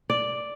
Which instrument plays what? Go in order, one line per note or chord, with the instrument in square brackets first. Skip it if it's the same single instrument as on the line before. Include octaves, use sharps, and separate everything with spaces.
[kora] D5